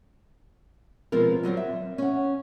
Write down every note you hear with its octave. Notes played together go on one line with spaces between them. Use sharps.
B2 F3 G#3 C4 A#4
D3 F#3 G3 C4
E5
C#4 F#5